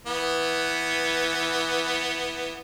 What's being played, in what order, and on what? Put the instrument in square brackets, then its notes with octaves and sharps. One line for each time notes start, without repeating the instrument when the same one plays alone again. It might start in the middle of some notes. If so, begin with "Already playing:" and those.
[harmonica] E3 B3